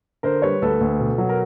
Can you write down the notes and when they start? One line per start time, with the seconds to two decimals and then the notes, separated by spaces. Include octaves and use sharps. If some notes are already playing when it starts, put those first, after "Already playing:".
0.23 D3 A#4 C5
0.42 G3 B4 C#5
0.62 D2 A4 B4
0.81 D2
1.00 B2
1.18 F#3
1.29 A#4